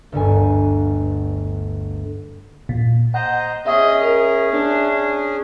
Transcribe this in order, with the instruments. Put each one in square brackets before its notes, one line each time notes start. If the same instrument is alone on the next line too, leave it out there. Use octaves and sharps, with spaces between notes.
[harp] G1 D2 G2 G#5
[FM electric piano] A#2
[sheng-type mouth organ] C5 D#5 A#5 [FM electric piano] F#5
[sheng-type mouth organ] C#4 G#4 [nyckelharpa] D#5 [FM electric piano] E5
[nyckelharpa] A#4
D4